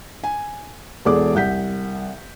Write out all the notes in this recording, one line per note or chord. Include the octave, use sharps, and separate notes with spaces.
G#5
E1 E2 G#4 A4 D5 D6
C2 F#5 G6 B6